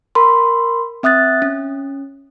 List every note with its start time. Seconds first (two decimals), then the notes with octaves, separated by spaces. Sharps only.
0.15 A#4 B5 C6
1.03 C4 E5 D#6 F#6 A6
1.42 C#4